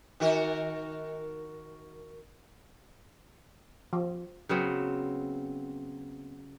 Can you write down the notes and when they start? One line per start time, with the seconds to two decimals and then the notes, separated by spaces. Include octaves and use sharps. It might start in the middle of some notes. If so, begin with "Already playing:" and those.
0.20 D#3 F#4 A#4
3.93 F3
4.49 C#3 F#3 B3 C4